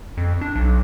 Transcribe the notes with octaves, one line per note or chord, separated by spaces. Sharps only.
F2
D4
B1